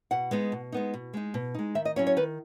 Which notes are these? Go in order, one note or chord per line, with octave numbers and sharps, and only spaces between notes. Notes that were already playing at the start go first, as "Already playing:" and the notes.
B2 F#5
G#3 B3 D#4
B2
G#3 B3 D#4
B2
G#3 D#4
B2
G#3 D#4
D#3 E5
D#5
F#3 C#4 E4 C#5
C#5
D#3 B4